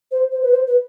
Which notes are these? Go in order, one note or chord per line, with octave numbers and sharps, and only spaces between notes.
C5
C5
B4
C5
B4